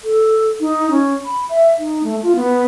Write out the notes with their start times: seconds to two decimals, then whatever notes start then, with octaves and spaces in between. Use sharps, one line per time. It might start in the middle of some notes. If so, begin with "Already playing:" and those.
0.04 A4
0.60 D#4
0.91 C#4
1.25 B5
1.49 E5
1.79 D#4
2.03 A3
2.23 F4
2.36 B3